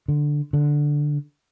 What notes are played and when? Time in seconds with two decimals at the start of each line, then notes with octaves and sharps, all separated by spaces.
0.08 D3
0.53 D3